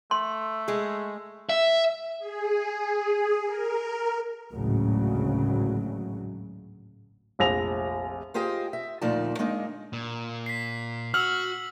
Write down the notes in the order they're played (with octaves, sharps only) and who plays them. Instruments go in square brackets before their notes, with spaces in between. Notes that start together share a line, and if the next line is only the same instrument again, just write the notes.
[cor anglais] A3 [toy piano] C6
[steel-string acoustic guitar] G#3 G#4
[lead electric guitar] E5
[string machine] G#4
A#4
[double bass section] G#1 D2 A2 C#3 F#3
[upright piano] F1 A#1 A#6 F7
[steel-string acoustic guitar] F4 G4 G#4 C5 D#5 G5
E5
D2 A#2 F3 D#4 D5 A5
G#3 A#3 D4 D#4
[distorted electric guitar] A#2
[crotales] B6 C7
[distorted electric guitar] F#4 [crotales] E6 F#7 [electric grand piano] F6